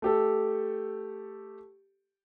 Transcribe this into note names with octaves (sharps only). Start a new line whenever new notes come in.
A3 G4 A4